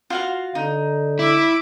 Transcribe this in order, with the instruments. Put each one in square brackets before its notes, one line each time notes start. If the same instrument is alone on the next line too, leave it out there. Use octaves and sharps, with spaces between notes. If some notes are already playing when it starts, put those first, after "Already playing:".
[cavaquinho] F4 F#4 F5
[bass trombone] D3 [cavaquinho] D#4
[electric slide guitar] E4 [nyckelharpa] E5 D6